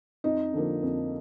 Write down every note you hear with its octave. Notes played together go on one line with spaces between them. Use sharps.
F2 D#4
D3 F3 A#3
F2